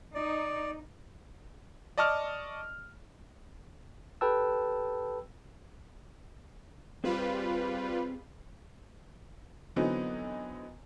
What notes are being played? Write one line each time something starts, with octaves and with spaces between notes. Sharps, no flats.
D#4 D5
D5 D#5 A5 C#6 F6
G4 A4 B4 G5 A5 E6
G3 C4 F4 G#4 B4 C5
D3 E3 F#3 B3 C4 D#4